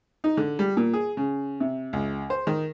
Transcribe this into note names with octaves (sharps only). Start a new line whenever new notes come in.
D#4
D3
G3
A#2
G#4
C#3
C3
C#2
C5
D#3